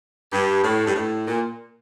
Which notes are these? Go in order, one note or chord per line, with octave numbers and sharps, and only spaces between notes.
G2
A2
G2
A2
A#2